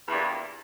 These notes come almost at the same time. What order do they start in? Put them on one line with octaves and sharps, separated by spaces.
E2 E3 G2 A#2